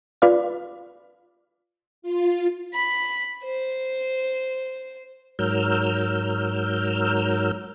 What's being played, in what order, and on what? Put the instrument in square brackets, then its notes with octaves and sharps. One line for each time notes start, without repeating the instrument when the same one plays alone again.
[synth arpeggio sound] F4 B4 D5 F5
[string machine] F4
[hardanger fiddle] B5
C5
[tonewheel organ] G#2 F#3 A#4 E6 F6 G6